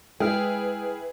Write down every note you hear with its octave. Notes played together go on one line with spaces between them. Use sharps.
G#3 E4 G#4 B4 G5 F6